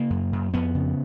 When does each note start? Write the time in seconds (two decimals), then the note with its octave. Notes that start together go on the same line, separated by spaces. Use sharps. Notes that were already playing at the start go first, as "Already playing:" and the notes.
Already playing: C#3 A#3
0.10 F#2
0.33 F#2
0.54 F2 B3
0.75 C#3